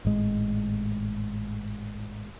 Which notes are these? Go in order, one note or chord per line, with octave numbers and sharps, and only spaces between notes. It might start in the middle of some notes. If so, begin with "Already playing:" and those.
G#1 A2 G#3